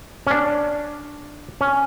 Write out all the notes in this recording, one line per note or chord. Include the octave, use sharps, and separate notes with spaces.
C#4
D4
C#4